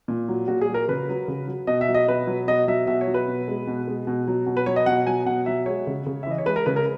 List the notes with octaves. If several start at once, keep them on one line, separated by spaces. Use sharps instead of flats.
A#2
F#3
A#2 F#4
G#4
F#3
A#4
C#3 B4
F#3
C#3
F#3
B2 D#5
E5
F#3
D#5
B2 B4
F#3
B2 D#5
F#3 E5
B2 E5
C#5
F#3
B4
B2
G#3
B2
G#3
B2
F#3
B2
B4
F#3 C#5
D#5
B2 F#5
F#3 G#5
B2 F#5
F#3 E5
G#3 C#5
C#3
C#3
E5
E3 D#5
C#5
G#3 B4
A#4
C#3 B4
A#4